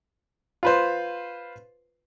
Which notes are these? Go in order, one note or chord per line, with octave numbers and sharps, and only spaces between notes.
F4 B4 C5